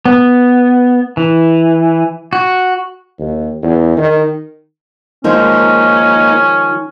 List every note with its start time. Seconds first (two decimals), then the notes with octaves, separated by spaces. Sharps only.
0.05 B3
1.17 E3
2.33 F#4
3.19 D#2
3.62 E2
3.97 D#3
5.24 D#3 F3 G#3 A#3 C#4 D#4